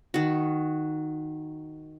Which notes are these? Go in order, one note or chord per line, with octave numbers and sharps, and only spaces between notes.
D#3 F#4